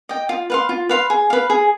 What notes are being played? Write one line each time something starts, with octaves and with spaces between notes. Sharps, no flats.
D#5 G5
F4
B4 F5 C6
F4
B4 F5 C6
G#4
B4 F5
G#4